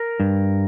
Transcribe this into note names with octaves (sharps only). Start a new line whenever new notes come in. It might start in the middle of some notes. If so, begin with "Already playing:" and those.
Already playing: A#4
G2